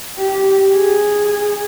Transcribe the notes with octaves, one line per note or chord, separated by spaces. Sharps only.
G4
G#4